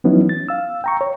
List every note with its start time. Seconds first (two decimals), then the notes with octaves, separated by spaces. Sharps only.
0.04 E3 F#3 B3 C#4 D#4 E4
0.29 A6
0.49 F5 E6
0.84 G5 A#5 C#6
1.01 C#5